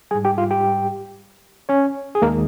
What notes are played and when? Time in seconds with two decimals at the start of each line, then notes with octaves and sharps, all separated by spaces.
0.11 G3 G#4 G#5
0.15 G#2
0.25 G4 G5
0.38 F4 F5
0.51 G4 G5
1.69 C#4 C#5
2.15 G#4
2.22 D#2 D#3 G#3 A#3 A#4